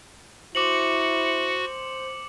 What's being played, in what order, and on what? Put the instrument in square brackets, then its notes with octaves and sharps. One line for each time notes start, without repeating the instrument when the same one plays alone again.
[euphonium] E4 [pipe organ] F#4 [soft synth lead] C5 [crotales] D6 C#7 F#7